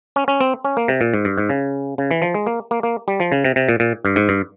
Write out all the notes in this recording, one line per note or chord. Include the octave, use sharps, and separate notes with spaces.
C#4
C#4
C4
C#4
A#3
C3
A#2
G#2
G2
G#2
C#3
C#3
E3
F3
G#3
A#3
A#3
A#3
G3
F3
C#3
C3
C3
A#2
A#2
G2
G#2
G2